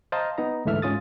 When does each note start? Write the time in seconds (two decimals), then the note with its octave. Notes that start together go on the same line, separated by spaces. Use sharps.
0.12 C5 D#5 F5 A5 A#5
0.38 B3 D#4 A#5
0.65 D2 G#2 E3 A3 E5 F6
0.82 G#2 C#4 F4 D#6 A6